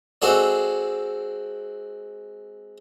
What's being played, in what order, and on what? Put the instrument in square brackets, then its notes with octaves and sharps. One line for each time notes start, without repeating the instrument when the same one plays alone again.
[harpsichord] G#3 C4 F#4 G#4 A4 D5